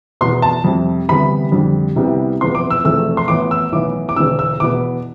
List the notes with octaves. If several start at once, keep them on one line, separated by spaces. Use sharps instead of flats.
E2 B2 B3 C6
A5
F2 C3 G3
D2 C3 E3 G3 B3 B5
F2 D3 G3
C2 C3 G3 B3
E1 E2 C3 F3 B3 C6
D6
E6
E1 E2 C3 F3 A3 E6
C6
A1 A2 E3 B3 D6
E6
B1 A2 E3 B3 D6
D6
E1 E2 D3 E6
E6
E2 B2 B3 D6